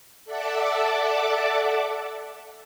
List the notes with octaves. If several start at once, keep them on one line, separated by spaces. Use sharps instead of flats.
A4 D5 E5 F#5 A5 D6